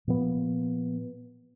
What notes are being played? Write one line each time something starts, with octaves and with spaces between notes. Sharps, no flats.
A#2 F3 B3